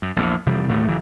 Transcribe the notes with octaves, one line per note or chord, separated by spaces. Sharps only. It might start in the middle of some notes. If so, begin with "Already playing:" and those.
F#2
A#1 E2
F1 C3 E3 G3
D#1 D2 A2 A3
F#1 E3